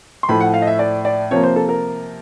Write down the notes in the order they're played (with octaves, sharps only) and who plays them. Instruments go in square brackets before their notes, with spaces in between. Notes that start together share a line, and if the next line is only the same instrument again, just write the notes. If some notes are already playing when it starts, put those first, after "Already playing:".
[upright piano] C6
A2 F3 A3 B5
F#5
F5
D#5
E5
D5
D5
C3 F3 A#3 C#5
C5
A4
A#4